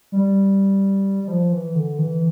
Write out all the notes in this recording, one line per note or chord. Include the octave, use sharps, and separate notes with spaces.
G3
G3
F3
E3
D3
E3